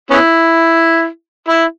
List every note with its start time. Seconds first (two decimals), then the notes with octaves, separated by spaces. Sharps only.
0.11 B3 C#4 E4
1.48 E4